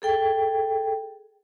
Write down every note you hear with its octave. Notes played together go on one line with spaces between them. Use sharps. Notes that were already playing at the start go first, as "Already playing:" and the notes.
G#4 A4 G5